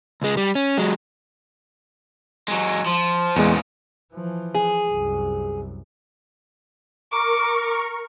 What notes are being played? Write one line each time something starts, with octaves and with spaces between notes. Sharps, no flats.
C#2 G#3
G3
C#4
F#3 G#3
F#3 G#3
F3
E2 A#2 C#3 G#3
E3 F3
G#4
C2 F#2
A#4 C#6 D6